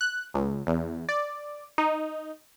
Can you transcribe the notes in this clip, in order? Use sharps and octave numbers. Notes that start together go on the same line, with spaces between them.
F#6
C#2
E2
D5
D#4